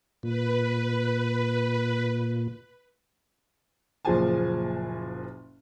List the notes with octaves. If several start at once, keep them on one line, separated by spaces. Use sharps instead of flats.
A#2 B4
F#1 A#2 F3 G#4 G#5 A5